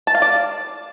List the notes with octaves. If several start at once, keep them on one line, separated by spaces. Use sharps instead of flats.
A5
F5
D5